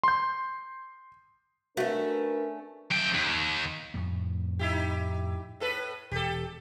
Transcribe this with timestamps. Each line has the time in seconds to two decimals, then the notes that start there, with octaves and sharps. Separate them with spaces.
0.03 C6 G6
1.77 A3 C#4 D4 F#4 A#4 B4
2.91 F#2 G5
3.14 D#2
3.94 F2 A2 A3
4.59 D#4 E4 G4
5.60 A2 A4 B4
6.11 E1 G4 A4